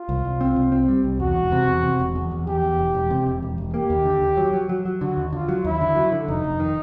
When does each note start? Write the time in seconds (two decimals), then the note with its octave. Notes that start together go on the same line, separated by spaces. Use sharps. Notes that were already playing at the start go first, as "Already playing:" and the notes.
Already playing: F4
0.09 C2
0.25 C2
0.41 C4
0.56 C2
0.72 C4
0.88 G3
1.04 C2
1.20 E2 F#4
1.36 E1
1.52 C3
1.68 E2
1.83 C3
1.99 E1
2.15 E2
2.31 E2
2.47 E2 G4
2.63 E2
2.79 E1
2.95 E1
3.10 C3
3.26 E1
3.42 E1
3.58 E1
3.74 A#3 G4
3.90 D#2
4.05 D3
4.22 D#2
4.37 F#3
4.53 F#3
4.69 F#3
4.85 F#3
5.01 D3 F#4
5.17 D#2
5.33 D3 F4
5.49 F#3
5.64 D#2 E4
5.80 D3
5.96 F#3
6.12 D3
6.28 F1 D#4
6.44 F1
6.60 D#3